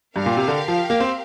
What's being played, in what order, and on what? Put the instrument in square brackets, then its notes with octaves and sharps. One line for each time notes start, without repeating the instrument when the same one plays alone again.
[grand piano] G2 [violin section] G4 A#4 F5
[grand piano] A#2
C3
D3
F3
A#3
C4